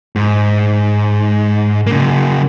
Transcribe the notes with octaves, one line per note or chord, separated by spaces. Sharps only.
G#2
C#3 A#3